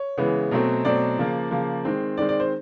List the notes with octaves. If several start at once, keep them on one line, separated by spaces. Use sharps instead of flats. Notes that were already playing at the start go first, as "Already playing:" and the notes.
Already playing: C#5
C#3 E3 G#3 B3
B2 F#3 A3 C4
B2 F#3 A3 C4 D5
C#3 F3 A#3
C#3 F3 A#3
D#3 G#3 C4
D#3 G#3 C4 D5
D5
C5